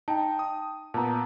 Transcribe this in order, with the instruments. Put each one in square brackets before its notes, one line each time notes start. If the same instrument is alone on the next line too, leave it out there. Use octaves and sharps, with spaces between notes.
[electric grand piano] D#4 [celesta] G5 A5
[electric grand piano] D#6
[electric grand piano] A#2 B3 [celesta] A5 A#5